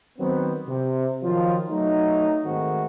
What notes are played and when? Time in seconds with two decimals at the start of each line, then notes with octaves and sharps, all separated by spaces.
0.18 D#3 F#3 B3 C4
0.67 C3
1.23 D#3 F3 F#3 F4
1.69 F#3 A3 D#4
2.45 G#2 D#3 A3 C4 F#4